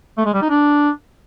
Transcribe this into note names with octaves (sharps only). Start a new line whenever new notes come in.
A3
G#3
G3
D#4
D4